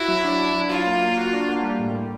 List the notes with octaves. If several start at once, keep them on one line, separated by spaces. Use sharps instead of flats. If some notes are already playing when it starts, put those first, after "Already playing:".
Already playing: E4 F#4
F#3
D4
D4
F#3
F#3 F4
A#3
A#3
F#4
D4
A#3
G3
A2
G3